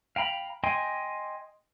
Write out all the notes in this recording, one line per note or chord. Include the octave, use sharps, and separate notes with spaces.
F5 G5 A#5 B5
D#5 G5 G#5 C6